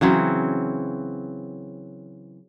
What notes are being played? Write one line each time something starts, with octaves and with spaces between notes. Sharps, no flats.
C#3 E3 F#3 C4